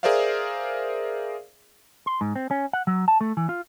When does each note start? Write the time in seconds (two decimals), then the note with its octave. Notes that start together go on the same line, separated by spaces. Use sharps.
0.03 G#4 A#4 C5 D5 E5 F5
2.06 C6
2.21 G#2
2.36 C4
2.51 C#4
2.73 F#5
2.87 F#3
3.08 A5
3.21 A3
3.37 E3
3.49 F4